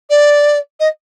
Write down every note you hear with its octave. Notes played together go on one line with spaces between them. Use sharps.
D5
D#5